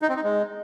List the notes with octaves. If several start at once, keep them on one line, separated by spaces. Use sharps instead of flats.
D#4
C4
D#4
G#3